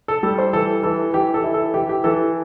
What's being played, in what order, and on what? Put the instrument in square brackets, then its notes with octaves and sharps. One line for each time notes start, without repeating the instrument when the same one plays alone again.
[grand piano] A4
G3 A4
C5
E3 A4
E3 A4
E3 G4
A4
E4
A4
E3 G4
G4
E3 A4